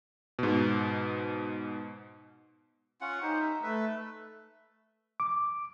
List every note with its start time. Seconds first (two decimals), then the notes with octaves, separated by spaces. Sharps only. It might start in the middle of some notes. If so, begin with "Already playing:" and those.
0.39 G#2 B2
3.01 C#4 F4 F#5
3.23 D#4 G4 C5
3.40 E5
3.63 A3 B4 E5
5.20 D6